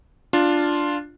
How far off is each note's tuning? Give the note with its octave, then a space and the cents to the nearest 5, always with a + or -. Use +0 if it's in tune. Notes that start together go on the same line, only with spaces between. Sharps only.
D4 +0 F4 +0